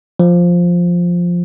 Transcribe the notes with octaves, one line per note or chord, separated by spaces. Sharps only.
F3